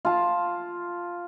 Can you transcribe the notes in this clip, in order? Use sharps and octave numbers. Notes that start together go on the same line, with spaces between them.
F4 A5